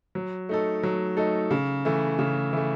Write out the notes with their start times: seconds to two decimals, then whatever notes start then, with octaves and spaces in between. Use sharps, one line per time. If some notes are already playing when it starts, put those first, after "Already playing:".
0.15 F#3
0.49 A3 D#4 A4
0.83 F#3
1.17 A3 D#4 A4
1.51 C#3
1.85 E3 A3
2.19 C#3
2.53 E3 A3